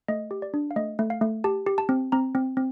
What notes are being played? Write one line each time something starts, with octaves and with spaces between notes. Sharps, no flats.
A3 D#5
G4
D5
D4
F5
A3 D#5
A3
F5
A3
G4 A5
G4
A5
C4
C4 A#5
C4
C4